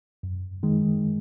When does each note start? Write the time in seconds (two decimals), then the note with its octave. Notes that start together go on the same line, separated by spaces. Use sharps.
0.23 F#2
0.63 D#3 G#3